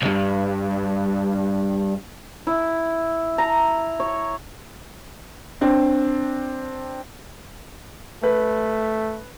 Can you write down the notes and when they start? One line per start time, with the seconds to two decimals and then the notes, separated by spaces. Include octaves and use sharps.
0.02 B1 G2
2.47 E4
3.38 A#5
4.00 C#5
5.61 C4 D4
8.24 A3 B4